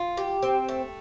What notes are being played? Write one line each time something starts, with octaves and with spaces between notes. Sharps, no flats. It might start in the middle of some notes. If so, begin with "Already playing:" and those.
Already playing: F4
G4
C4
A3